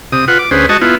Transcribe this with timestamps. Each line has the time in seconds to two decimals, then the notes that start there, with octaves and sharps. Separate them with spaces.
0.12 C3 D#6
0.28 F4 B4 F#5
0.39 D6
0.51 D2 C#4 G#4 B4 C5
0.69 G#3 F#4 D#5 A5 C#6
0.81 B3 E4 F4